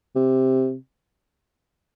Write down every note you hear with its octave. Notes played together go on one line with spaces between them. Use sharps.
C3